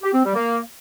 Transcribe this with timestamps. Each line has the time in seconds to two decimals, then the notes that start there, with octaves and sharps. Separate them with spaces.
0.03 G4
0.14 C4
0.24 G3
0.35 A#3